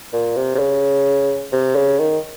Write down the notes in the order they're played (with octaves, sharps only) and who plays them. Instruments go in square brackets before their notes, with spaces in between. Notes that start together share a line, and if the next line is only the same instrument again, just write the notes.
[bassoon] A#2
C3
C3
C#3
C3
C#3
D#3